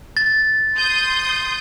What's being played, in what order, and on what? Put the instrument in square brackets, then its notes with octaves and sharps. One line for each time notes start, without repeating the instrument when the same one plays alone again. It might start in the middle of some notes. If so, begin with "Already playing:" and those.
[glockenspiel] A6
[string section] C6 D#6 G6